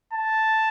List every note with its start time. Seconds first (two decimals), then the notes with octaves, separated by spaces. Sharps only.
0.13 A5